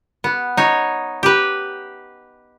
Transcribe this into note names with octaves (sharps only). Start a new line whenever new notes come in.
B3
D#4 C#5
G4 B4